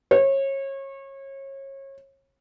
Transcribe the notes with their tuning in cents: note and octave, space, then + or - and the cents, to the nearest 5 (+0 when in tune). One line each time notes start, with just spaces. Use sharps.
C#5 -30